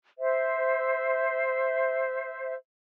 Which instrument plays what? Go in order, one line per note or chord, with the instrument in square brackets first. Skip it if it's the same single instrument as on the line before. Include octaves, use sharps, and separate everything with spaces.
[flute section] C5 E5